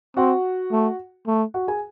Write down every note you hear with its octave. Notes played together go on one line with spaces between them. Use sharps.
C4 F#4 F#5
A3
A3
F#4 F#5
G#4 G#5